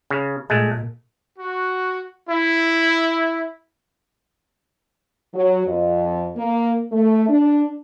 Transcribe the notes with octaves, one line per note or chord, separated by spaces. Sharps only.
C#3
A#2 G#3 A3
F#4
E4
F#3
F2
A#3
A3
D4